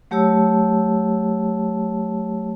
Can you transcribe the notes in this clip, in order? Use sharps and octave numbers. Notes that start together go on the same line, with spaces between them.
F#3 A3 G4 C#5 A5 E6